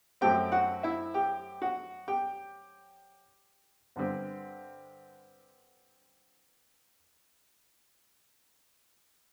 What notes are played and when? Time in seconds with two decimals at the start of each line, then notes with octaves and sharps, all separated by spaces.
0.21 F#2 F#3 A3 C4 G4 G5
0.52 F#4 F#5
0.83 E4 E5
1.14 G4 G5
1.62 F#4 F#5
2.08 G4 G5
3.96 G2 D3 G3 C4